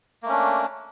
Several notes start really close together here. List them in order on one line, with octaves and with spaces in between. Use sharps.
A#3 A3 C#4 D4